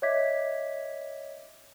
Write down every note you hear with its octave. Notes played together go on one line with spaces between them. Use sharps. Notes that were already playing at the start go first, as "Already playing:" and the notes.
C#5 D#5 E5 D6 G#6 B6